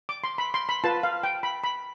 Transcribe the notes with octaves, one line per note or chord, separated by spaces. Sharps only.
D6
C6
B5
C6
B5
F4 B4 A5
F5
G5
B5
B5